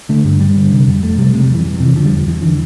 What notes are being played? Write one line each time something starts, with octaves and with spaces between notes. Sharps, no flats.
D3 A3
G2 G3
G2 G3
D3
C3
F2
F2 A3
C3 G3
C3 A3
G3
F2
E3
F2
C3
E3
D3 F3
G3
E2
F3
E2 E3
D3 E3